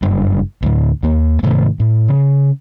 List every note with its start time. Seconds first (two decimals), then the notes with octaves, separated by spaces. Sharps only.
0.03 F#1 G2
0.62 D2 A2
1.03 D#2 A#3
1.43 G#2 C3 D#3 A3
1.80 A2
2.08 C#3